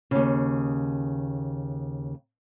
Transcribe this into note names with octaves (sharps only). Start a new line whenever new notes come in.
D#2 C#3